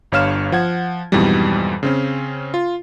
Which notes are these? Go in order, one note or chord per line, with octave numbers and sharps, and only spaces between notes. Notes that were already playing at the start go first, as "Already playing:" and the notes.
G1 G2 C#5 F5 F6 E7
F3 F#5 G#6
F2 G#2 B2 E3 G3
C#3 C4 C#4
F4